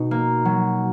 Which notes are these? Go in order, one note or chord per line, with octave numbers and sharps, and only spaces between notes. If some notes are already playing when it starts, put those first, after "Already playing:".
Already playing: B2 D#4
A#3
F#3